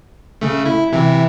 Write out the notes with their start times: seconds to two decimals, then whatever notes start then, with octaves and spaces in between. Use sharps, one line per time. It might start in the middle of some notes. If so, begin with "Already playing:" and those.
0.41 C#3 A3
0.65 E4
0.93 C3 E3 E4